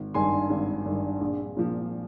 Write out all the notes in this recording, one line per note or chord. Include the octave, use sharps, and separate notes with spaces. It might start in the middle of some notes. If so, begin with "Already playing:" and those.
Already playing: G#1
G2 D#3 G#5 C6
G#1
G2 D#3
A#1
A#2 F3